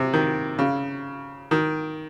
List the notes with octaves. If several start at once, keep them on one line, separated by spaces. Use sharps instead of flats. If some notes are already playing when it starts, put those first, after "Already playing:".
Already playing: C3
D#3
C#3
D#3